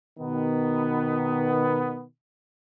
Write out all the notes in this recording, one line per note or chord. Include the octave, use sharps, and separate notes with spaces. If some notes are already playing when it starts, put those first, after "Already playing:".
B2 D#3 B3